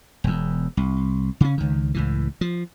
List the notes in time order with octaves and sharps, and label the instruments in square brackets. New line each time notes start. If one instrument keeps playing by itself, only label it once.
[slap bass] E1 E2
C2
C#3 C#4
C#2 D#3
C#2 A2 E3
F3